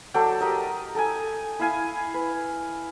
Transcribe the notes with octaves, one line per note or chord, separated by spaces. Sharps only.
F#3 A4 D5 G5
G4 A#4 D#5
A4 G5 G#5
E4 E5 F5 G#5
B4